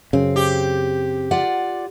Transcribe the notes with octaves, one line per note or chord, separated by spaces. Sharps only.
F#2 C#3 C4
G4
F4 D5 F#5